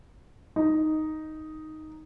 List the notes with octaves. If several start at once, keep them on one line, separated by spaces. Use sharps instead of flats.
D#4